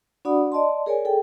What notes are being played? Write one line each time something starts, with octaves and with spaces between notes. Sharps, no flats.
D4 F#4 D5 F#5 B5 D#6
D5 D#5 A5 C6
G#4 A#4 C#5 D5 G#5
G#4 A4 G5